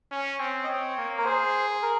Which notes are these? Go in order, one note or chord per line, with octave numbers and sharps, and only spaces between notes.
C#4
C4
D#5
C4 C#5
A#3
A#4
G#4 C5
A#4